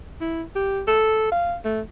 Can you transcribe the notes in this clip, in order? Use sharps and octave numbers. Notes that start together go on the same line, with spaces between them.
E4
G4
A4
F5
A3